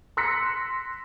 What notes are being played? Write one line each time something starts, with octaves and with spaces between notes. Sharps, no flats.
C6 E6 F#6 A#6 B6 C#7